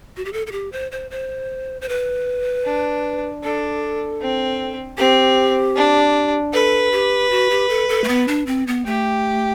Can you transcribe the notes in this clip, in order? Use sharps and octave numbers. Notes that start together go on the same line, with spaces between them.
F#4
G4
A4
A4
G4
C5
C5
C5
C5
B4
D4
D4 A4
C4
C4 G4
D4
A4 B4
G4
F#4
G4
A4
A4
A3
B3
D4
C4
B3
A3 G4